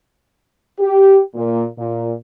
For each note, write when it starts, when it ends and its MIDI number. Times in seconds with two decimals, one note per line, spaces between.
0.80 1.19 67
1.35 1.64 46
1.78 2.13 46